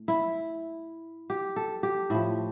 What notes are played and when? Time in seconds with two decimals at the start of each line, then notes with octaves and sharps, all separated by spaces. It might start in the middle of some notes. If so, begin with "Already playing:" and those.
Already playing: A2
0.08 E4
1.30 G4
1.56 A4
1.83 G4
2.10 A2 F3 E4